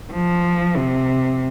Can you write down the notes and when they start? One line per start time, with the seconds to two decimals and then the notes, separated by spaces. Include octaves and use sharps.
0.13 F3
0.76 C3